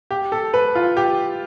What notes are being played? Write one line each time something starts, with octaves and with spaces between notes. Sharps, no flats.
G4
A4
B4
F4
G4